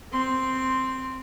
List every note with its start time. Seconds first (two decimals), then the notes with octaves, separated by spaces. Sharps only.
0.12 C4 C6